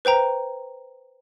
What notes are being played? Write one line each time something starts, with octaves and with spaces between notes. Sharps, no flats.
B4 C5 G5 A#5